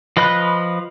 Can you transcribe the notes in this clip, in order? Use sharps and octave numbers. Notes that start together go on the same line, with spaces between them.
F3 B4 D#5 B5 F#6